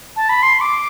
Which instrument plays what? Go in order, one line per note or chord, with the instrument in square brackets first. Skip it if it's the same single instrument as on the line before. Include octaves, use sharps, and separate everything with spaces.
[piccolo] A5
B5
C6
D6